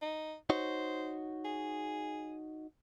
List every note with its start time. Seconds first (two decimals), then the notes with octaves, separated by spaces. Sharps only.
0.02 D#4
0.50 D#4 F#4 C5 C#5
1.45 G#4